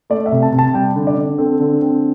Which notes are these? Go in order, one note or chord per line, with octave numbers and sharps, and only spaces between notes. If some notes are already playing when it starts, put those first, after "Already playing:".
A3 D5
E5
C3
A5
C3
A5
G3 G5
D3
D5
D3
C4 A4
D3
C4